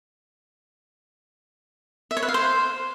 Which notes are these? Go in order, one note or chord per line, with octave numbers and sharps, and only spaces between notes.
E5
C#5
B4
F5
C5